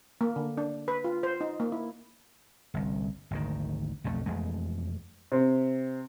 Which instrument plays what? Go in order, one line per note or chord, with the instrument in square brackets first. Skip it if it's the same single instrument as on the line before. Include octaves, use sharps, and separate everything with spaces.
[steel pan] A#3
D3
D4
B4
F4
C5
D#4
A#3
E4
[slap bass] G1 C2
G#1 D2 D#3
B1 F2 F3 A3
E1 F2 G#3 A3
[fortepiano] C3 C4